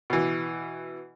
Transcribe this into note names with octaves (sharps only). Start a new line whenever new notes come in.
B2 E3